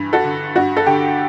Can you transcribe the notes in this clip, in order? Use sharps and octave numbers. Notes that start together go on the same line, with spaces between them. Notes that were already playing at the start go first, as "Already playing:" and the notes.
Already playing: G2 E3
F#4 A4
D3
G2 F#4
A4
D3 G4